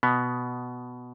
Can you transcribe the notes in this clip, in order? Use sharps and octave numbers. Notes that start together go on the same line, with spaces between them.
B2 B3